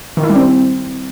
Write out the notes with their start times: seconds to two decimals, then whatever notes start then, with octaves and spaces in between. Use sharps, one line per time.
0.17 D#3
0.23 E4
0.30 G3
0.36 C4